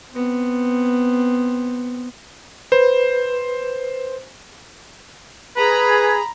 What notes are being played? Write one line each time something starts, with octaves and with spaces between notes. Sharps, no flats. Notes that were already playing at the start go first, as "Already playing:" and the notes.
B3 C4
B4 C5
G#4 B4 A#5 B5